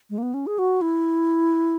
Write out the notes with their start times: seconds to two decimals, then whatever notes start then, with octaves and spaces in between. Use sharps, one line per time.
0.10 G#3
0.18 A#3
0.23 B3
0.34 C#4
0.47 G#4
0.59 F#4
0.81 E4